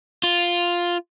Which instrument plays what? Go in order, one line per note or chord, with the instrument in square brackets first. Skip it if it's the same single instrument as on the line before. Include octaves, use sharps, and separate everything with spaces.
[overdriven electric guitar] F4